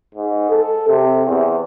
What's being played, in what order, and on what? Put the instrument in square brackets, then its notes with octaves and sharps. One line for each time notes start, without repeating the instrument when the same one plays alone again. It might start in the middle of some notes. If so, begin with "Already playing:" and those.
[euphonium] G#2
A4
C3
E2